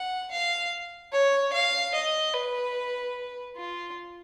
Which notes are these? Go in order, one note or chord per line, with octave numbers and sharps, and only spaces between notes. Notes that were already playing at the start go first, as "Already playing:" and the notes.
Already playing: F#5
F5
C#5
F5
D#5
B4
F4